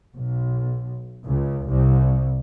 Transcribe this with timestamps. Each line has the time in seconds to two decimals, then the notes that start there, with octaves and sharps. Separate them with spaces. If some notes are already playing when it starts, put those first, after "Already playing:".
0.14 B1
1.25 C#2
1.68 C2